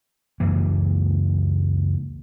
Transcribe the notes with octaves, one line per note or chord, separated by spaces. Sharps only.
C#2 F#2 E3 A#3